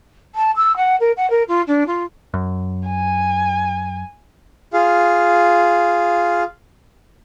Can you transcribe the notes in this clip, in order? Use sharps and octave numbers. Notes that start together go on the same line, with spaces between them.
A5
E6
F#5
A#4
F#5
A#4
F4
D4
F4
F#2
G#5
F4 G#4 F5